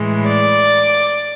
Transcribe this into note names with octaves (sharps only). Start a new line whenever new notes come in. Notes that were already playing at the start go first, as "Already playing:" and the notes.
Already playing: A2 E3 G#3
D5